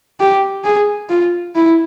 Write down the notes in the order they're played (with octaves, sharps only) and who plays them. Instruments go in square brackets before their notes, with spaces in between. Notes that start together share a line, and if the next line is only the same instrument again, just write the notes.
[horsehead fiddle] G4
G#4
F4
E4